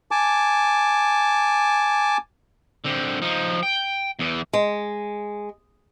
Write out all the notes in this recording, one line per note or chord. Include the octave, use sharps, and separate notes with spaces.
G#5 A5 D6
D3 C4
F3 D#4
G5
E2 E3
G#3